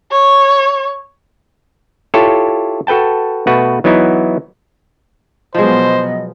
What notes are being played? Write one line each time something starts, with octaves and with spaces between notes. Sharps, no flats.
C#5
E4 F4 G4 A4 C#5
F#4 A4 B4 G5 A5
B2 A3 F#4 B4
E3 F#3 B3 D#4 E4
B2 F3 F#3 G#3 B3 C5 D#5